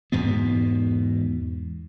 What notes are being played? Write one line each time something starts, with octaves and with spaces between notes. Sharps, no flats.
E2 G#2 B2 B3